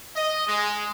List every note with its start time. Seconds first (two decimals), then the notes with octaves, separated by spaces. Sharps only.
0.16 D#5
0.48 G#3